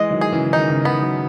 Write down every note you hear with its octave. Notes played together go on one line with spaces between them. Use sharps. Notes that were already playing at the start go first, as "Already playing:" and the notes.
Already playing: E3 G#3 D#5
D#3 F#3
G#4
C#3 E3
D#3 D#4
C#3
D#3 B3
D#3 F#3